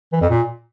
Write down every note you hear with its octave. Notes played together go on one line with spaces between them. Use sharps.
E3
F2
A#2